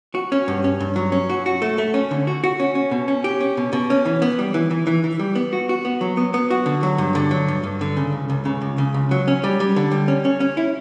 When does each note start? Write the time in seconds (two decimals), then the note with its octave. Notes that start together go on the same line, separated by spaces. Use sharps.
0.15 F#4
0.32 C#4
0.48 G2
0.64 C#4
0.80 G2
0.96 F#3
1.12 C#4
1.30 F#4
1.46 F#4
1.62 A3
1.78 A3
1.94 C#4
2.11 D3
2.27 F#4
2.44 F#4
2.59 C#4
2.75 C#4
2.91 B2
3.08 C#4
3.24 G4
3.41 C#4
3.57 B2
3.73 B2
3.90 C#4
4.05 E3
4.22 B3
4.39 G3
4.54 E3
4.71 E3
4.87 E3
5.04 E3
5.19 G3
5.35 B3
5.53 F#4
5.69 F#4
5.85 B3
6.01 F#3
6.17 B3
6.34 B3
6.50 F#4
6.66 D3
6.83 F#3
6.98 G2
7.15 D3
7.31 F#3
7.48 G2
7.64 G2
7.81 D3
7.97 C#3
8.12 C#2
8.30 C#2
8.45 C#3
8.61 C#2
8.78 C#3
8.94 C#2
9.11 F#3
9.28 C#4
9.44 G3
9.60 G3
9.76 D3
9.92 G3
10.08 C#4
10.25 C#4
10.40 C#4
10.57 E4